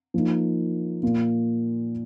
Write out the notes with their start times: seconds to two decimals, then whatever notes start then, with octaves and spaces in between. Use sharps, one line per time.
0.14 F3 A#3 D#4
1.03 A#2 A#3 F4